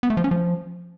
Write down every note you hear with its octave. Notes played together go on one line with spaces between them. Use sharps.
B3
A3
F3
C#4
F3